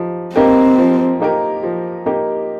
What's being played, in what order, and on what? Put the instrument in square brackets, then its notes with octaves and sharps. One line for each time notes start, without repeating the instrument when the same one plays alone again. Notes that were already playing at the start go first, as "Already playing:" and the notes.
Already playing: [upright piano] F3 D#4 G4
[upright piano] A#3 D#4 G4 A#4 [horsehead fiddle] C4
[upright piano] F3
A#3 D#4 G4 A#4
F3
A#3 D#4 G4 A#4